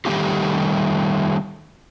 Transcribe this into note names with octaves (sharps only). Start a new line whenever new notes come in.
D#3 G3 A3 A#3 F4 G4